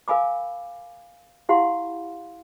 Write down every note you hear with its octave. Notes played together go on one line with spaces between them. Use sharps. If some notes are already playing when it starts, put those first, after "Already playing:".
A#4 F5 G#5 B5 D6
E4 G4 F5 F#5 B5 C6